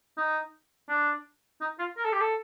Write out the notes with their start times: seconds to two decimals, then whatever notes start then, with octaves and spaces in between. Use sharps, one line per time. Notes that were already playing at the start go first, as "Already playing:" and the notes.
0.17 D#4
0.89 D4
1.61 D#4
1.79 F4
1.97 A#4
2.05 A4
2.12 G4
2.21 A4